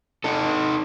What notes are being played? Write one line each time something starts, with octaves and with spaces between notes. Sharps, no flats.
D#4 A4